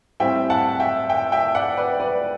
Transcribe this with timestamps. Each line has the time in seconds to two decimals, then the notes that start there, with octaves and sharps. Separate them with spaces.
0.20 A2 G3 C4 E5 G5
0.50 F#5 A5
0.80 E5 G5
1.10 E5 G5
1.32 E5 G5
1.55 D5 F#5
1.77 B4 D5
2.00 B4 D5